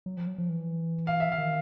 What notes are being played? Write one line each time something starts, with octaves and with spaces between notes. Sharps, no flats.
F#3
F3
F#3
F3
E3
F5
E5
F5
D#3